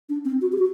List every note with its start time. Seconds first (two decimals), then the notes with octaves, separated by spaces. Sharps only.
0.09 D4
0.25 C4
0.41 F#4
0.52 G4
0.58 F#4